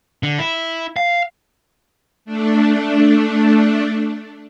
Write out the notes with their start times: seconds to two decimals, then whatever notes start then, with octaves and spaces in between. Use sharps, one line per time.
0.23 D3
0.38 E4
0.96 F5
2.25 A3 D4